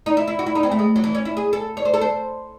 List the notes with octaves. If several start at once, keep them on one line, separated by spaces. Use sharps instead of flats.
D#4
E4
E4
F#4
E4
D#4
C4
A3
G#3
F#3
E3
C#4
E4
G#4
A4
C#5
C5
A4
C5